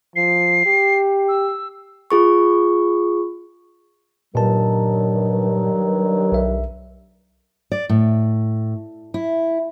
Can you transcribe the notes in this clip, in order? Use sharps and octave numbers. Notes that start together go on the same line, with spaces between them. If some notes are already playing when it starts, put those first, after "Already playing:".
F3 C7
G4
E6
F4 G#4 C#6
G2 A#2 D#3 F#3 A5
B1 E5
D5
A2
E4